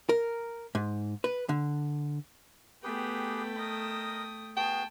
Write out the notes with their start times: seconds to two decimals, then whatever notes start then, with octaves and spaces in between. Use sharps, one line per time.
0.09 A#4
0.75 G#2
1.24 B4
1.49 D3
2.84 A3 B3 G4 G#4 B4 G5
3.58 A#4 D#5 D#6
4.56 B3 F#4 G#4 G5 A5